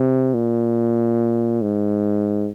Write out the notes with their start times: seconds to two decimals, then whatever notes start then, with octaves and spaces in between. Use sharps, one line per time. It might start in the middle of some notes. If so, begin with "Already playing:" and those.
Already playing: C3
0.34 A#2
1.61 G#2